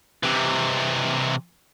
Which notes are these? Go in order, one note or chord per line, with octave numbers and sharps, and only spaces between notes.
C3 E3